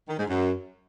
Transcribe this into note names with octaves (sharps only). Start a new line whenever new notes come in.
D#3
G#2
F#2